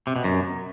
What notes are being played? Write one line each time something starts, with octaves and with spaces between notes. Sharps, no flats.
C3
B2
F#2